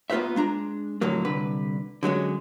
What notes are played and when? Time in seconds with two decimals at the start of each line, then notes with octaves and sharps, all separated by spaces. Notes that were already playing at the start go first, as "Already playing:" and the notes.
0.10 A#3 B3 F4 B4 C5 E5
0.36 G#3 D4 A#5
1.01 F2 A2 D3 F#3 A#3
1.25 C2 D3 B4
2.03 D3 F#3 G#3 C#4